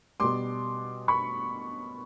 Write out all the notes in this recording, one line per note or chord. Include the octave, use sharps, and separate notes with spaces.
B2 G3 C6 D6
B5 C#6